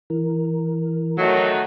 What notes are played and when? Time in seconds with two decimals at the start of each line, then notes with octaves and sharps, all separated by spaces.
0.10 E3 A#4
1.18 D#3 F#3 A3 F#4